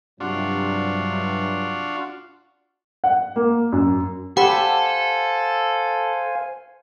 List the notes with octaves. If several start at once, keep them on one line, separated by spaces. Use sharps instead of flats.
G2 C3 F#3 D4 F4 F#4
F#5
A#3
F#2
G4 A4 C5 F5 F#5 G#5 B5